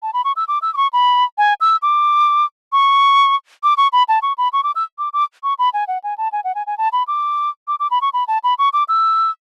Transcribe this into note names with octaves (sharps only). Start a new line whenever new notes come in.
A5
B5
C#6
E6
D6
E6
D6
C#6
B5
G#5
E6
D6
C#6
D6
C#6
B5
A5
C#6
B5
C#6
D6
E6
D6
D6
C#6
B5
G#5
F#5
G#5
A5
G#5
F#5
G#5
G#5
A5
B5
D6
D6
D6
B5
C#6
B5
A5
B5
C#6
D6
E6